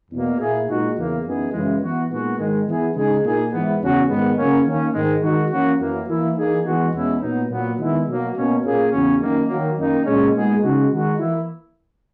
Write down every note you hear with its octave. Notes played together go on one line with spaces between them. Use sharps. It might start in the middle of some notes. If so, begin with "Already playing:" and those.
E2 B2 A#3
A#2 A#3 E4 G#4
A#2 G#3 D#4 F#4
E2 C#3 E3 A#3
F#2 E3 B3 D#4 G#4
F#2 C#3 E3 G#3
E3 B3 F#4
A#2 G#3 B3 D#4 F#4
G#2 D#3 G#3
E3 B3 E4 G#4
C#3 G#3 D#4 G#4
A#2 A#3 D#4 G#4
G#2 E3 B3
E2 C#3 F#3 C#4 F#4
G#2 D#3 G#3 B3
C#3 F#3 A#3 C#4
D#3 A#3 C#4
G#2 D#3 G#3
D#3 G#3 D#4 F#4
E3 A#3 C#4 F#4
F#2 E3 A#3
E3 A#3 E4
E3 A#3 D#4 G#4
E3 G#3 B3 F#4
E2 B2 G#3 C#4 E4
A#2 F#3 B3 D#4
A#2 F#3 B3
D#3 G#3 B3 E4
B2 F#3 A#3
B2 A#3 C#4
A#2 A#3 C#4 G#4
E2 C#3 F#3 C#4
F#2 D#3 A#3
D#3 F#3 A#3
F#2 D#3 A#3 D#4
A#2 G#3 C#4
A#2 G#3 B3 D#4 G#4
C#3 G#3 D#4 F#4
D#3 G#3 D#4 F#4
E3 A#3 E4